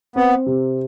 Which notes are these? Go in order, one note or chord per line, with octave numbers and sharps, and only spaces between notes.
B3 C4
C3